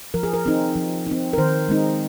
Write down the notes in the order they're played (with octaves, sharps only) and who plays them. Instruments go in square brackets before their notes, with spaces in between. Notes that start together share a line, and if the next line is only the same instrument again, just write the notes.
[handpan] F3 A#4
G#4
A#4
C4 D#4
F3
C4 D#4
A#4
D#3 C5
G#3 C4 D#4